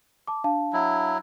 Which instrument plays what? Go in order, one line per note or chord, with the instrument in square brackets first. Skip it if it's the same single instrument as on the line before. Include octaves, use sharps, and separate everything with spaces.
[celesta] A5 D6
D4 F5 A5
[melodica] F#3 E4